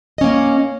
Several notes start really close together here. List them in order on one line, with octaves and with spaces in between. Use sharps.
D#5 C#4 A#3